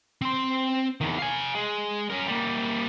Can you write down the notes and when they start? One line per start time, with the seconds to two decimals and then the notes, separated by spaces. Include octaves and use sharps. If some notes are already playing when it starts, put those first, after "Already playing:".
0.22 C4 C6
1.01 E2 D#3
1.19 F5 G#5
1.55 G#3
2.10 C#4 A#4
2.27 G3 A#3